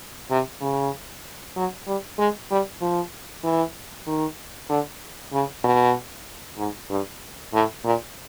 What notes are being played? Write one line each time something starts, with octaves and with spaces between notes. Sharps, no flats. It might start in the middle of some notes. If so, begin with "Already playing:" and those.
C3
C#3
F#3
G3
G#3
G3
F3
E3
D#3
D3
C#3
B2
G#2
G2
A2
A#2